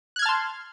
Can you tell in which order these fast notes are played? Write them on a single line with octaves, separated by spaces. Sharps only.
F#6 G#6 F6 A5 C6